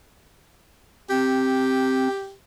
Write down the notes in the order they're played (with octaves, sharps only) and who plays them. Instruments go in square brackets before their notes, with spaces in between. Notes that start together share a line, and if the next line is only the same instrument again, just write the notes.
[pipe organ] C4 [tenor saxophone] G4